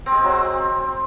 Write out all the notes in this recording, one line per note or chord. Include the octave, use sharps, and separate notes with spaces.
C4
G#3
C4
F#3
C4